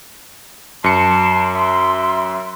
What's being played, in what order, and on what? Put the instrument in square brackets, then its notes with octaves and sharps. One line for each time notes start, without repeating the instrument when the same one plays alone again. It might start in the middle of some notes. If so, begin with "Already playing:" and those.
[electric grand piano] F#2 C#7 [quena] A5 [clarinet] C6
[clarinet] E5 [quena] C6